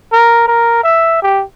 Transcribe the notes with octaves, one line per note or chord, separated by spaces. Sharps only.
A#4
A#4
E5
G4